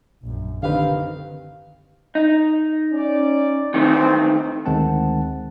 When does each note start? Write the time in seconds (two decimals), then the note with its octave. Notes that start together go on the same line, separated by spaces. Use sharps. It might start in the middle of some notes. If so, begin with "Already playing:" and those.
0.22 A#1 F#2
0.63 D3 D#3 C4 G4 B4 F5
2.15 D#4
2.93 C#4 D5
3.74 D#3 E3 A3 C4
4.66 D2 D#3 G#3 C4 F#5 A5